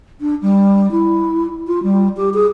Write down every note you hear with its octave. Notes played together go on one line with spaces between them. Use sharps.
D4
G3
E4
F4
G3
G4
G#4